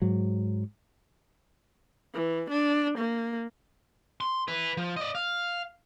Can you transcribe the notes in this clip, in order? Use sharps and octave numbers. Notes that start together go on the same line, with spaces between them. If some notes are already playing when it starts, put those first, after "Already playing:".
G#2 F#3
E3
D4
A#3
C6
E4 B4
F3
D5 D#5
F5